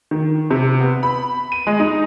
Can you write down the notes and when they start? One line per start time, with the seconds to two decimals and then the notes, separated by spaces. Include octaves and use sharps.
0.11 D#3
0.51 C3
0.81 B3
1.03 B5
1.52 D#7
1.67 G#3
1.80 D#4